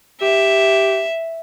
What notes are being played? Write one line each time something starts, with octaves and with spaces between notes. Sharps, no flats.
G4 E5